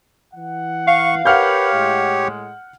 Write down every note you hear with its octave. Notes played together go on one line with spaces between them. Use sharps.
E3 F#5
F5 C#6
G4 A#4 B4 C#5 F#5 F6 G6
A2 G#3